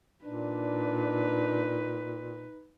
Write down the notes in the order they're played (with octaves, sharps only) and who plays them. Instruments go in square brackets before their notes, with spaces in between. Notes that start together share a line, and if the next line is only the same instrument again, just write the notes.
[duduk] A#2 [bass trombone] D4 [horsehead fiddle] D#4 B4